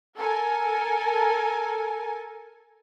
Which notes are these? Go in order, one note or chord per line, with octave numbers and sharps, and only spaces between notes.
A4 A#4 G#5